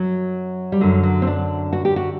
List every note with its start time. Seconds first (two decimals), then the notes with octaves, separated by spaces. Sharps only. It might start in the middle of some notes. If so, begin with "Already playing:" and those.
Already playing: F#2 F#3
0.72 G3
0.81 F#2 D3 F#3
1.03 F#3
1.22 C4
1.27 D4
1.73 F#4
1.85 G4
1.96 F#4